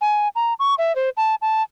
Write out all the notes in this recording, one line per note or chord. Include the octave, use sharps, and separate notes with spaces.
G#5
A#5
C#6
E5
C5
A5
A5